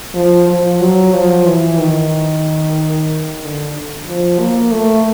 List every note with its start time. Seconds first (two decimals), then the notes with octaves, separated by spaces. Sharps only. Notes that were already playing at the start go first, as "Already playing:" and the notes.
0.15 F3
0.48 F3
0.81 F#3
1.13 F3
1.46 E3
1.78 D#3
3.41 D3
4.07 F3
4.39 A#3
4.72 A3